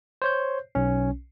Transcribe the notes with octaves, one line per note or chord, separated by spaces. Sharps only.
C5 C#5 G6
B1 C#4